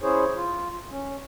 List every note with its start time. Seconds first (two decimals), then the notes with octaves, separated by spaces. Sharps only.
0.01 C#4 E4 G#4 C5 C#5
0.36 F4
0.90 C#4